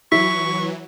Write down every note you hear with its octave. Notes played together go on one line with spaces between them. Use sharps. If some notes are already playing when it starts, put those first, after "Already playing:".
E3 F#3 E4 C#6 B6